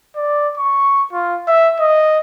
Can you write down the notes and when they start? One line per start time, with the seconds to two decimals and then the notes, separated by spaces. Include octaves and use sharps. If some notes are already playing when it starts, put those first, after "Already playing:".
0.16 D5
0.57 C#6
1.13 F4
1.48 E5
1.80 D#5